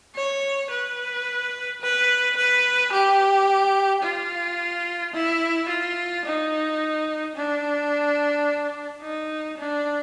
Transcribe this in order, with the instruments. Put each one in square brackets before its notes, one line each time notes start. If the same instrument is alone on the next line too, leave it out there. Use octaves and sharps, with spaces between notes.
[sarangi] C#5
B4
B4
B4
G4
F4
E4
F4
D#4
D4
D#4
D4